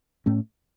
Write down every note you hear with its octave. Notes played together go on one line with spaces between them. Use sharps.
A2 A3 C#4